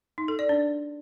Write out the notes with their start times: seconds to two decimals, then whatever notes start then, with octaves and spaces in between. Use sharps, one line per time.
0.18 D#4
0.28 A4
0.39 D5
0.49 D4